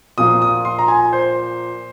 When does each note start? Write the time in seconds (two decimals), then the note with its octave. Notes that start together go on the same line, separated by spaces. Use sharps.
0.18 A#2 F3 A#3 F4 D#6
0.42 D#6
0.65 C6
0.79 A#5
0.88 G#5
1.13 C5